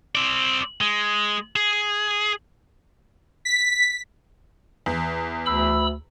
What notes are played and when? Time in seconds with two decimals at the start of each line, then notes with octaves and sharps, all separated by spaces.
0.15 C4 D5
0.81 G#3
1.56 G#4
3.45 B6
4.86 E2
5.46 D2 B5 E6